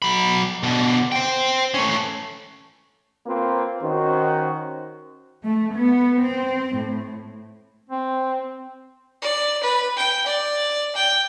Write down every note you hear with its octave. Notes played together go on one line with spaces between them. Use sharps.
F#3 B5
B2 D3
C5 G5
A3 C#4
A#3 C4 F4 B4
D#3 C#4 F#4 C5
A3
B3
C4
A2
C4
D5
B4
G5
D5
G5